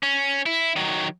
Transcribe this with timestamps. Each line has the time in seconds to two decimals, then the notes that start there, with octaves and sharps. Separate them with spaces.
0.03 C#4
0.46 E4
0.76 D#3 F#3